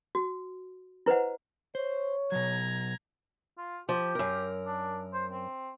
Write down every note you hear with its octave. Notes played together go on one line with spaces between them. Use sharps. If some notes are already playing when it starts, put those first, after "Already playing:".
F#4
E4 B4 C5 D#5 F#5
C5 C#5
B2 F#3 A#5 G#6
F4
F3 G4
F#2 A#4
D4
C5
C4